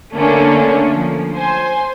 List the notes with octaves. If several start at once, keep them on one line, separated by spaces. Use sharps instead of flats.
D3 A3 A#3 C#4 D4
F3
C5 G#5